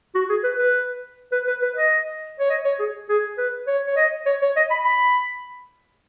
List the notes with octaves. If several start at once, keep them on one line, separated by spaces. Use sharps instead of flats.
F#4
G#4
B4
B4
B4
B4
B4
D#5
C#5
D#5
C#5
G#4
G#4
B4
C#5
C#5
D#5
C#5
C#5
D#5
B5
B5